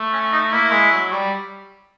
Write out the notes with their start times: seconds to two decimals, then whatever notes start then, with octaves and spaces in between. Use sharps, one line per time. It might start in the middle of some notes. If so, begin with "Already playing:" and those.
Already playing: A3
0.13 C#4
0.32 D#4
0.52 A#3 E4
0.72 G#3
0.92 F#3
1.12 G3